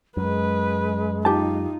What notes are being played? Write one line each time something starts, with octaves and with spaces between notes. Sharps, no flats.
F#2 G#3 B4
D#4 F4 G4 A5